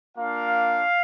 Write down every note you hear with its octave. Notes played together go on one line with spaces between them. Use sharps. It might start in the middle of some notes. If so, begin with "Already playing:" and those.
A#3 D4 F4 F5